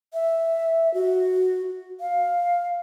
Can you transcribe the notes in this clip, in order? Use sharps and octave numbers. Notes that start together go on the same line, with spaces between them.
E5
F#4
F5